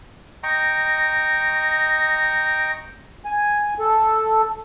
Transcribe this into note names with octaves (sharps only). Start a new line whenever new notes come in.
D#5 G5 A#5 C#6
G#5
A4